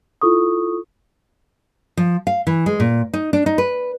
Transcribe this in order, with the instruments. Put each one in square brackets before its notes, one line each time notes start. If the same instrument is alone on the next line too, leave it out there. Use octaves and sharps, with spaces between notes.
[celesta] E4 F4 A4 C#6 D#6
[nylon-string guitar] F3
F5
E3
G#3
A#2
D#4
D4
D#4
B4